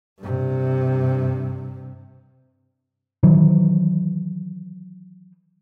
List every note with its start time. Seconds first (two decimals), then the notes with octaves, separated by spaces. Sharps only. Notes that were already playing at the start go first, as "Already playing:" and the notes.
0.20 G2 C3
3.23 D#3 E3 F#3